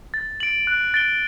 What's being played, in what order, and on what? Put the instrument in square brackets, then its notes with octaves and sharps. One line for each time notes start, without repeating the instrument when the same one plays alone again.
[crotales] A6
D7 F#7
F#6
A6 D7 G7